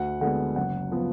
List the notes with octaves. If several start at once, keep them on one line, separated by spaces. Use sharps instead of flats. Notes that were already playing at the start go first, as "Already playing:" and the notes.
Already playing: D2 F#5
D3 G#3 B3 F#5
F#1 F#5
F3 B3